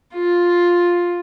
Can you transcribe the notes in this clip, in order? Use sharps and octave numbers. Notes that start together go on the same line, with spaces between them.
F4